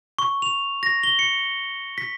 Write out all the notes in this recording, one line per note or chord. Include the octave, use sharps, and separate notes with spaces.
C#6
F7
A#6
G7
C#7
B6